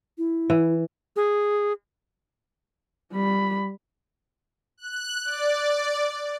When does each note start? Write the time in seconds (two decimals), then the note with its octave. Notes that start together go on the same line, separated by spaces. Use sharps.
0.18 E4
0.50 E3
1.16 G#4
3.13 G3 B5
4.77 F#6
5.25 D5